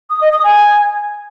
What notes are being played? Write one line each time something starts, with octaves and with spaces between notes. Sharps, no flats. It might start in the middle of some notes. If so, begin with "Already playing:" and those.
D#6
D#5
D#6
G#5